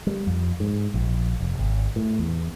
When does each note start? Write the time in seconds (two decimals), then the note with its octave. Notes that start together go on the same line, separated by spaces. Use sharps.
0.07 G3
0.27 F2
0.60 G#2
0.94 A#1
1.40 F1
1.59 G#1
1.96 A2
2.19 E2